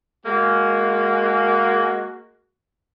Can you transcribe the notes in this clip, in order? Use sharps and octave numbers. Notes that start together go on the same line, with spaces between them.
G#3 A#3 F#4